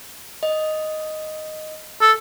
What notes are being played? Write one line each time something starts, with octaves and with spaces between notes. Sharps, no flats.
D#5
A4